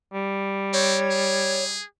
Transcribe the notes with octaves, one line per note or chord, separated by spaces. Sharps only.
G3
C4 C#5
G#4